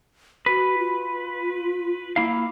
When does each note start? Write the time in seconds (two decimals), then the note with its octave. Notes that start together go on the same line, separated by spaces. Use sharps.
0.46 F#4 B4
0.78 F4
2.16 A#3 E4 F5